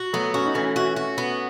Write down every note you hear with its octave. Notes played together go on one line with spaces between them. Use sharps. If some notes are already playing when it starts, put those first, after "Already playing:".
Already playing: F#4
F#3 A3 B3
A3 C#4 F#4
D#4
E3 A3 C#4
F#4
F#4
B3